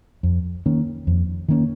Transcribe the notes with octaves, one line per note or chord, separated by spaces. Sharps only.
F2
D#3 A#3 C#4
F2
D#3 A#3 C#4